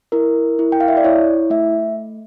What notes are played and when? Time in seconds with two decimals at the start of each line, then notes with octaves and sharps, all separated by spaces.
0.12 E4 A#4
0.59 E4
0.72 G5
0.80 F5
0.88 E5
0.97 D5
1.04 E4 C#5
1.50 A3 E5